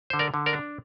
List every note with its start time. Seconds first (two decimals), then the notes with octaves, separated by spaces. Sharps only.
0.10 D3 C5
0.19 A#4 D5
0.34 D3
0.46 A#4 D5
0.53 D4